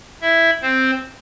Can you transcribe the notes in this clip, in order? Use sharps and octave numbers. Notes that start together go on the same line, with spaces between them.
E4 E5
C4 C5